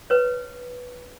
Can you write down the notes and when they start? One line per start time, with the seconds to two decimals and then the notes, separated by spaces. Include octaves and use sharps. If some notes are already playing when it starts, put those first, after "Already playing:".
0.10 B4 C#5